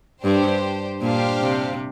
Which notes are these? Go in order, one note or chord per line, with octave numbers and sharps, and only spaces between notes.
G2 D4 G4 C5
A#2 D4 G4 C5 F5
C3